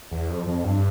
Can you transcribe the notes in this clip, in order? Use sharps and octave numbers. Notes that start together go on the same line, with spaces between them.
E2
F2
F2
G2